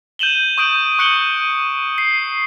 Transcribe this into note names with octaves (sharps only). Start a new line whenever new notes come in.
G6 D#7 E7 F#7 G7
C#6 D#6 G6 D7 F#7
C#6 F#6 C#7 D7 F#7 G7
C7